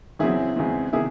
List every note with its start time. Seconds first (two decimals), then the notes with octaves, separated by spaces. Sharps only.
0.19 E2 C#3 F#3 C4 E4 G#4
0.56 E2 C#3 G#3 C4
0.93 C3 D#3 E4 G#4